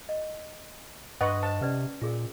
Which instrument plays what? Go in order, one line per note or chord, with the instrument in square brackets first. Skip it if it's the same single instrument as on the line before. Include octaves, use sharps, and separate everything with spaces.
[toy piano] D#5
[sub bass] G2 [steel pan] B4 D#5 F#5 [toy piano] C6 C#6 D#6
[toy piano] C5 D#5 [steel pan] A5
[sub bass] C3 [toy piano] C#4 B4 D5
[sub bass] A#2 [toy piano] F4 G#4 A#4